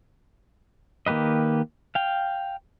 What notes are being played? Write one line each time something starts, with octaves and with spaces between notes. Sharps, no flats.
D#3 A#3 G4 B4 D#5
F5 G5